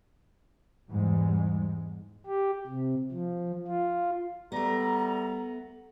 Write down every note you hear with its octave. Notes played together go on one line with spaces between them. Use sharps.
E2 G#2 G3 G#3
G4
C3
F3
F4
G3 A3 B3 A#5